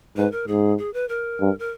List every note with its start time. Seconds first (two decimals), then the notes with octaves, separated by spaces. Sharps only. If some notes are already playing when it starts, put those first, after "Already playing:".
0.17 G#2 B4
0.32 A#4
0.48 G#2 G#4
0.78 G#4
0.94 B4
1.09 A#4
1.40 G2
1.59 A#4